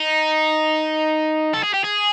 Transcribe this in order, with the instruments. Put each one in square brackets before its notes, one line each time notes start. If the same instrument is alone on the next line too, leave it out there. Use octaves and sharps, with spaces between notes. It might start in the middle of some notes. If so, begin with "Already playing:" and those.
Already playing: [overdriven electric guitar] D#4
A4
G#4
G4
G#4